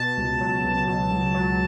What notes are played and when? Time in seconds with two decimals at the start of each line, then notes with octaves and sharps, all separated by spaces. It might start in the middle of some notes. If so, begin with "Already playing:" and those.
Already playing: B2 A5
0.17 C#2
0.41 F#3
0.64 C#2
0.87 B2
1.11 C#2
1.34 F#3